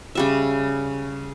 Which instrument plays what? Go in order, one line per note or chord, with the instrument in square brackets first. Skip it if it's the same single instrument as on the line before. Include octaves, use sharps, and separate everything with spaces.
[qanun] C#3 G3 E5